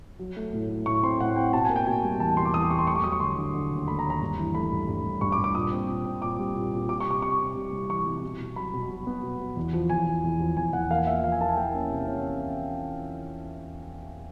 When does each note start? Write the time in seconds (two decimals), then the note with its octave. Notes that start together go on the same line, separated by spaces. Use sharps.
0.19 F#3
0.36 A3
0.53 A2
0.69 A3
0.86 A2 C#6
1.03 C4 C6
1.20 A2 F#5
1.36 C4 G5
1.53 B2 A5
1.65 A#3 G#5
1.76 G5
1.86 B2 G#5
2.03 G3
2.20 E2 A5
2.37 B2 C6
2.45 D6
2.54 E2 D#6
2.62 D6
2.70 G3 C#6
2.79 C6
2.87 A3 C#6
2.95 D6
3.04 F#3 D#6
3.12 C#6
3.20 D3 C6
3.38 D3
3.55 D3
3.71 D#2
3.87 A3 B5
3.99 A#5
4.05 D#2
4.10 A#5
4.21 G2
4.38 E3
4.55 A3 B5
4.72 G2
4.88 G2
5.04 G2
5.21 G2 C#6
5.32 D6
5.38 G2
5.44 D6
5.55 A#2 D#6
5.72 C4
5.88 A#2
6.05 C4
6.22 A#2 D6
6.39 G3
6.55 A#2
6.72 A#2
6.88 G3 D6
7.00 C#6
7.05 C3
7.11 D6
7.22 C3 C#6
7.39 C3
7.56 G3
7.72 C2
7.89 E3 C#6
8.06 C2
8.23 B2
8.40 B2
8.56 F#3 B5
8.74 B2
8.90 F#3
9.07 B3
9.23 B2
9.39 B2
9.57 E2
9.73 F3
9.90 E2 G#5
10.07 F3
10.24 E2
10.40 F3
10.57 E2 G#5
10.73 E2 F#5
10.91 A#3 F5
11.07 F3 E5
11.24 F3 F5
11.32 G#5
11.41 A#3 A5
11.49 G#5
11.57 A#3 G5
11.74 C#4
11.90 C3
12.08 C#4